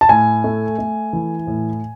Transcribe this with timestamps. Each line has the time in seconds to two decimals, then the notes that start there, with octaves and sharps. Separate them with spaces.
0.01 A5
0.09 A2 G#5
0.44 A3
0.78 A3
1.13 E3
1.47 A2